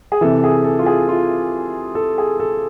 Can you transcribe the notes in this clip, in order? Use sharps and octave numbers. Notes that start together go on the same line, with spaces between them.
G#4
C3 E3 A4
G#4
A4
F4
G#4
F4
A4
G#4
A4